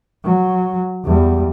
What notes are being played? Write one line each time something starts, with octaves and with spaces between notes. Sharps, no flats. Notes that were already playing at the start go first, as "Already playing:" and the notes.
F#3
E2 G3